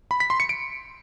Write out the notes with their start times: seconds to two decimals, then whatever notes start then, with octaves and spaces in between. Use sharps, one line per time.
0.11 B5
0.20 B6
0.30 C6
0.40 C#7
0.49 D7